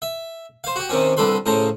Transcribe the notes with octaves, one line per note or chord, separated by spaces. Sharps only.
E5
C5 F5
F#4 G4
C3 D#3 C4 C#4
C2 D3 A4 B4 C6
A2 C#3 C5 A5 A#5